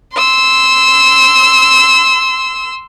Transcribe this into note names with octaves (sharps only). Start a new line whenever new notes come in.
C6 E6